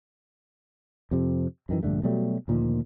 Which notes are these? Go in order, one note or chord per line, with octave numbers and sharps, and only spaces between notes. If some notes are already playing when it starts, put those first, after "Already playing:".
F2 C3
F#2 D#3 E3
A#1 G2 D3 A3
B2 F#3 G3 A3
D2 A#2 D#3 F3